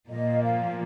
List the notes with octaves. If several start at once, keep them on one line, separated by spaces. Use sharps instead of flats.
A#2 F3 A#3 D#5
F5